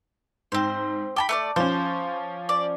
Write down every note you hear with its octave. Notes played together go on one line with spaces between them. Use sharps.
G#2 C4 C5
G5 A5 B5 D6
A3 B4 D5
F3 C#4 C5
D5